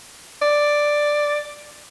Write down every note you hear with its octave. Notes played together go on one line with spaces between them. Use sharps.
D5